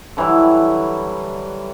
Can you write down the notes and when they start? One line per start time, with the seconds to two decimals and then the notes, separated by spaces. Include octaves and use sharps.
0.17 D3 E3 F#3 G3